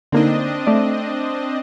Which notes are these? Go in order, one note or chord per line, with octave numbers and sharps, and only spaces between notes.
D3 A#3 C4 D4 D#4 D#5
A3 D5